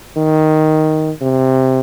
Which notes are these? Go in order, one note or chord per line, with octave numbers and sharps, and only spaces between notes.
D#3
C3